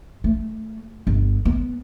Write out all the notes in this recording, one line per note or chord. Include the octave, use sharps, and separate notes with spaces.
A3
G1
B3